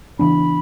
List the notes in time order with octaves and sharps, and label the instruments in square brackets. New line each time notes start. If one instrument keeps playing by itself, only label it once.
[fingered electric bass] C#3 E3 B3 D4 [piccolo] B5